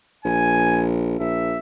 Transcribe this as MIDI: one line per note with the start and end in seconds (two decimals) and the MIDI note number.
0.25 1.16 34
0.25 0.87 80
1.20 1.59 34
1.20 1.59 76